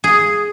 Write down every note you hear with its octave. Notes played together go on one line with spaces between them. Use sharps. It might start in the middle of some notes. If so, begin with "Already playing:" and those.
G#4